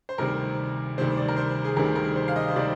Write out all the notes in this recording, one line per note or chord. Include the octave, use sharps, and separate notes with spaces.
C5
D2 C3 D#3 G3 C4 A#4
D2 C3 D#3 G3 C4 C5
D5
A#4
C5
G#4
D2 C3 D#3 G3 C4 A#4
A#4
C5
F5
D#5
C5
C3 D#3 G3 C4 D5